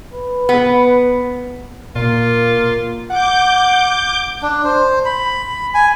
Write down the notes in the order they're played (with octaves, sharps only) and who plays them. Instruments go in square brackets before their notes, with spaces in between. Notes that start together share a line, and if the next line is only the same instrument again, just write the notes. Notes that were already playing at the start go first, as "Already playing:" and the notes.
[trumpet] B4
[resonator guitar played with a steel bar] B3
[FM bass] A#2 [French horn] A#3 [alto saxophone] F4
[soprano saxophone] F#5 [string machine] D6 G6
[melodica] D4
C5
B5
G#5